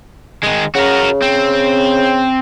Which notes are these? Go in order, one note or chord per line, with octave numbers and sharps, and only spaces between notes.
D#3 G#3
C#3 F#4 A#4
C4